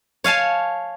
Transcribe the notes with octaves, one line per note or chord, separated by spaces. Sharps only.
C#5 F5 G#5 A5